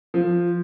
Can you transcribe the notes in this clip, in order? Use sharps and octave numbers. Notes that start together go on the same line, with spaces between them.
F3